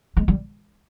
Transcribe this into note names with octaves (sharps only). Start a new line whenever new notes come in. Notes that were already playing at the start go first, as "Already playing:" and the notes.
G#3
G3